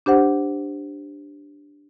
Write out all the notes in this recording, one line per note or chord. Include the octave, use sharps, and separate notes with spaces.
D4 G4 C5 F#5